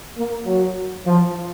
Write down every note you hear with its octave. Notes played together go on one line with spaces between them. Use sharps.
A#3
F#3
F3